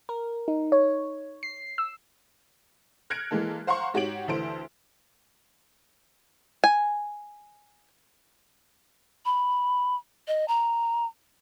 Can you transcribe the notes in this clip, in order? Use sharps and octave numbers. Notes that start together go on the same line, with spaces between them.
A#4
D#4
C#5
C7
E6
F6 F#6 G#6 A#6 C#7 D7
E3 G#3 A#3 A4
C5 F5 F#5 A#5 C6 C#6
G#2 F#4 G4 C#5 D7 F#7
D2 E3 A4 C5 D7
G#5
B5
D#5
A#5